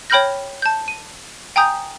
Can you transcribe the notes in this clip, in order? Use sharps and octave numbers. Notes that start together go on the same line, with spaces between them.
C#5 G5 B5 F6 G6 A#6
A5 G6
D#7
G5 G#5 A#5 D#6 G6